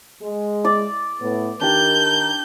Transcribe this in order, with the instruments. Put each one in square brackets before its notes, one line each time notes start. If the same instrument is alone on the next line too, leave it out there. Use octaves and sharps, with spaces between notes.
[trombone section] G#3
[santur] D5 D6
[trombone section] A2 B3
[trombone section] D#3 A#4 [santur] D4 G4 [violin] G6